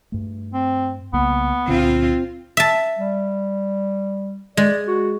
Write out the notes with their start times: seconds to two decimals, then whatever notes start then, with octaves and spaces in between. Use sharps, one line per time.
0.12 G2 A3
0.54 C4
1.13 C2 C#3 A#3 B3
1.68 C#2 A#2 D3 C4 F4
2.57 E5 A5
2.97 G3
4.57 G#3 D5
4.88 F#4